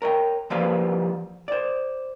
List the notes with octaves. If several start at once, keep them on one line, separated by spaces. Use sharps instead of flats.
A#4 C#5 D#5 G5
E3 F3 G3 A#3 B4 F5
C5 D5